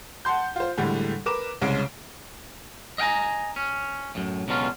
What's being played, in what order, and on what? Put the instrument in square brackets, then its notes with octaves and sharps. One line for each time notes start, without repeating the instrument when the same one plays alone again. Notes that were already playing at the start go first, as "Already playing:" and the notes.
[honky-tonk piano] F#5 A5 C6 G6
F4 C5
A2 D3 E3 G3 G#3
A#4 B4 D6 E7
C2 C#3 G#3 C#4 D7
[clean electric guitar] D#5 F5 G5 G#5 A#5
C#4
F#2 A2
C#2 B2 D3 F#3 C#4 F4